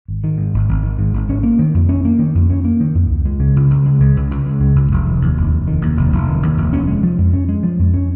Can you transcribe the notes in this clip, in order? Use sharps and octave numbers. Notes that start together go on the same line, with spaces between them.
G#1
D#3
G#2
G#1
G#1
D#3
G#2
G#1
C#4
A#3
D#3
F2
C#4
A#3
D#3
F2
C#4
A#3
D#3
F2
C#2
G#3
C#3
C#2
C#2
G#3
C#3
C#2
C#2
G#3
C#3
C#2
F1
D#3
D#2
F1
F1
D#3
D#2
F1
F1
D#3
D#2
F1
C#4
G#3
F3
F2
C#4
G#3
F3
F2
C#4